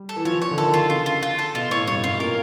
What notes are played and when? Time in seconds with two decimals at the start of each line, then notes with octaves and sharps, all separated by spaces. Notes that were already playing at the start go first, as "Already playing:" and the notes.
Already playing: G3
0.09 A4
0.16 E3
0.25 F3 C#5
0.42 C#5
0.51 D3
0.57 D#3 A4
0.74 F4
0.90 C#3 F4
1.06 F4
1.23 F4
1.39 A4
1.55 B2 F4
1.71 A2 C#5
1.87 G2 C#5
2.04 F#2 F4
2.19 A#2 A#4